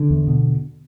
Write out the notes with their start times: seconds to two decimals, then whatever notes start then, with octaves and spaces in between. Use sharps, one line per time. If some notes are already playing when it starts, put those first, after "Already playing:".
Already playing: D3
0.10 E2
0.28 B2